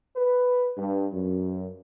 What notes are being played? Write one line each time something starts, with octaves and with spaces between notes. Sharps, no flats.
B4
G2
F#2